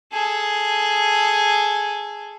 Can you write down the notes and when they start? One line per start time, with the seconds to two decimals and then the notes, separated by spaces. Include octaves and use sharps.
0.12 G#4 A4